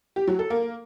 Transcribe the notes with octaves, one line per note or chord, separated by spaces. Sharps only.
G4
F#3
A4
A#3